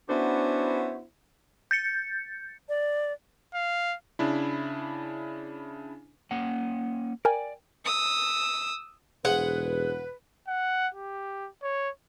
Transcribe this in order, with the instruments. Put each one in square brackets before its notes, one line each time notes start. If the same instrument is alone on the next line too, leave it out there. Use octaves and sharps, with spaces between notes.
[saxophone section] B3 C#4 D4 E4 F#4 C5
[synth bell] G6 A6 C#7
[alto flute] D5
[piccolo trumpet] F5
[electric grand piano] C#3 D4 E4
[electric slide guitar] A#3 C#4 F#5
[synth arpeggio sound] A#4 G5 G#5 [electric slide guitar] D5
[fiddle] D#6 E6
[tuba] E1 [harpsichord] G#4 C5 [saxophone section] B4 [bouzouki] F#5
[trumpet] F#5
G4
C#5